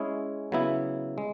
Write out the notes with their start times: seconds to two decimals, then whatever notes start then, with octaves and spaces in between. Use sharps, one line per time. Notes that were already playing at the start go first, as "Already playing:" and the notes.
Already playing: G#3 C#4 E4 G#4
0.52 C#3 F#3 B3 E4
1.18 G#3